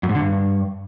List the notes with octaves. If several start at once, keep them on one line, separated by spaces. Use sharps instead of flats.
F#2
G#2
D3
G2